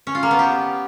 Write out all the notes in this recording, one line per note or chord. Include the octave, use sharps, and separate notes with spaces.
C#4
F4
A#3
B3
G4